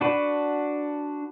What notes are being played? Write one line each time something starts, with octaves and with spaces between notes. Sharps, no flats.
D4 F#4 B4